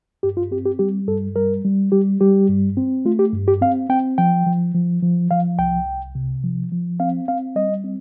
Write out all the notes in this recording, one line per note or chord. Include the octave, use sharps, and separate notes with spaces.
G2 G4
F4
C4 G4
G4
G3 G4
G2 A4
G3 A#4
G3
G3 G4
G3 G4
G2
C4
A3 F4
G4
G2
G4
C4 F5
C4 G5
F3 G5
F3
F3
F3
F3 F5
C2 G5
C2
C3
F3
F3
C4 F5
C4 F5
G3 D#5
C4